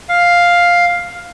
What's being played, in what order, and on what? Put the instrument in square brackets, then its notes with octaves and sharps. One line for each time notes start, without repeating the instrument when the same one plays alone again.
[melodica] F5